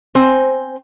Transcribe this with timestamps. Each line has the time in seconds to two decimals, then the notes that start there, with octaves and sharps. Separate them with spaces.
0.15 C4 C5 G#5